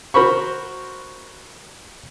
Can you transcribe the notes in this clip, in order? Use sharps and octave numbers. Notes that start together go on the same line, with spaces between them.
F#4 A#4 C5 B5 C#6